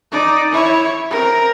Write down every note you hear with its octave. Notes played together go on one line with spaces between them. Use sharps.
D#4 D5
E4 C#5
C4 A#4